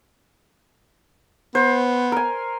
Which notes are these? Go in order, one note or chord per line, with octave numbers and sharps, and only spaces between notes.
B3 C5
A#4 G#5